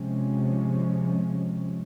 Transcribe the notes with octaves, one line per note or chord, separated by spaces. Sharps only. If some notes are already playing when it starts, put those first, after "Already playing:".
Already playing: C3 F3 G#3 C#4